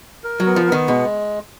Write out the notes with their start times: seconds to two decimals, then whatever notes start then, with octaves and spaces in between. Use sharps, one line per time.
0.24 A#4
0.40 F#3
0.46 B3
0.56 F3
0.67 B3
0.72 D#3
0.88 B2 G#3